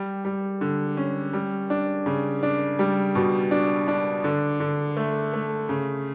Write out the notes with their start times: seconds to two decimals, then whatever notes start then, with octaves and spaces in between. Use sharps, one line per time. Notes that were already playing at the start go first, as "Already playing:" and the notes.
Already playing: G3
0.25 G3
0.61 D3
0.97 C#4
1.33 G3
1.70 D4
2.06 C#3
2.43 D4
2.79 G3
3.15 B2
3.51 D4
3.88 D4
4.24 D3
4.60 D3
4.97 A3
5.33 A3
5.69 C#3